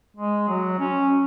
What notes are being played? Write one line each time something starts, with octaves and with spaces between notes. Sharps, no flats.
G#3
F#3
C#4